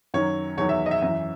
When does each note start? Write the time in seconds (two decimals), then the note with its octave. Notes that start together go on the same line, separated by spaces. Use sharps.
0.14 F#2 D#3 F#3 C#5
0.57 E2 D#3 F#3 C#5
0.69 E5
0.86 D#5
0.91 E5
1.02 F#2 E3 E5